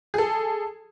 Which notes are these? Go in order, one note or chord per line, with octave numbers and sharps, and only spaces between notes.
G#4 A4